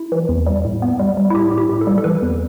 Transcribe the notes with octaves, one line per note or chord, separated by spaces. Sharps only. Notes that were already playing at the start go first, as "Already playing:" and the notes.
Already playing: E4
E3
E2
G3
A2
B3
G3
G3
E4
A2 G4
A2
G4
A2
A4
G3
A4
E3 B4
E2